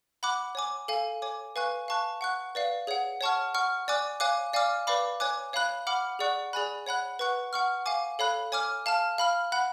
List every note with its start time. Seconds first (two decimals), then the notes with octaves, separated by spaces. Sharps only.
0.23 F#5 B5 D6 F#6
0.55 C#5 G#5 D6
0.88 A4 F5 G#5
1.22 C#5 G#5 D6
1.56 B4 F5 G#5 C#6 F#6
1.88 F5 A5 C#6 F#6
2.21 F#5 C#6 F#6
2.55 B4 D5 F5
2.87 G#4 C#5 F#5
3.21 C#5 F#5 A5 C#6 F6
3.54 F#5 C#6 F6
3.88 D5 G#5 D6 F#6
4.20 C#5 F5 G#5 D6 F#6
4.53 D5 F5 G#5 D6 F6
4.87 B4 D5 F5 B5 D6
5.20 C#5 G#5 D6 F#6
5.53 C#5 F5 B5 F#6
5.87 F#5 B5 D6 F6
6.19 G#4 D5 F#5 C#6 F#6
6.53 G#4 D5 G#5 B5 F#6
6.86 C#5 F#5 B5 F#6
7.19 B4 F#5 C#6 F#6
7.53 F#5 C#6 F6
7.86 F5 G#5 D6
8.19 A4 C#5 F5 B5 F#6
8.52 C#5 G#5 D6 F6
8.86 F5 A5 F6
9.18 F5 B5 F6
9.52 F#5 B5 F#6